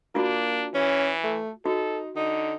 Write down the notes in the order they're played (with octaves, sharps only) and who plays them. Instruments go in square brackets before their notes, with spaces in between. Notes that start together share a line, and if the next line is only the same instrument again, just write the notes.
[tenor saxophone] A#3 [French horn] D4 [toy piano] F4 F#4
[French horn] E3 [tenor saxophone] C#4
[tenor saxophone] A3
[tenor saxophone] D#4 [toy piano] F#4 [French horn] A4
[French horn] D3 [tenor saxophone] D#4